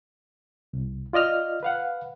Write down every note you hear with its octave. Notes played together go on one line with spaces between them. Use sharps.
C2
F4 D5 D#5 F6
B4 F5 F#5